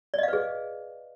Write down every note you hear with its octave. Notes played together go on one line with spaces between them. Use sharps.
G#4 B4 D5 D#5 F5